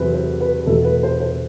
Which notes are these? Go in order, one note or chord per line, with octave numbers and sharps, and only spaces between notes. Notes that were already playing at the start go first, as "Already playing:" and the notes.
Already playing: E2 C3 F#3 A3 C4 B4
C5
B4
E2 B2 A3 A4
B4
C5
C5